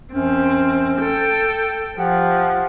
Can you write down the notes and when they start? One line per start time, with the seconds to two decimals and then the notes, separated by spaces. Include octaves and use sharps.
0.14 F#2 F3 C4 C#4
1.01 A4 G5
1.98 F3 G4 F#5